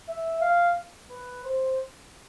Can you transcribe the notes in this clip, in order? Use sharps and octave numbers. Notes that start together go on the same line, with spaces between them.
E5
F5
B4
C5